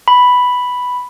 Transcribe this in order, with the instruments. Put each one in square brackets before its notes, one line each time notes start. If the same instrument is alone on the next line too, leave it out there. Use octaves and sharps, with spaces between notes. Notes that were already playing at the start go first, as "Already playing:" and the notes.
[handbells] B5